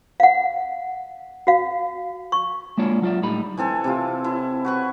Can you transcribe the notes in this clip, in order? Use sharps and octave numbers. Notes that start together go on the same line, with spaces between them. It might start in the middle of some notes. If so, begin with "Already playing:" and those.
F5 F#5
F#4 F5
C#6
G#3 A#3 D4 F4 C#5
F#3 F4 D5 E5
A2 D3 G3 D#4 B5
E3 C4 A4 G#5
C3 E4 F4
E4
F#4 B4 C#6